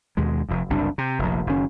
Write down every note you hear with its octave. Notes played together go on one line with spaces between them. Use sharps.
D#2 B2 G#3
F1 F2
F#1 C2 F#2 D4
C3
F1 A#1
F#1 D#3 C#4